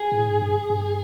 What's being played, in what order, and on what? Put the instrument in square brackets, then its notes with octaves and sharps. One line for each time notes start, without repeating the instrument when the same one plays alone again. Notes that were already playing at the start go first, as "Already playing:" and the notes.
Already playing: [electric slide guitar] G#4
[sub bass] A2
G#2
G2
G2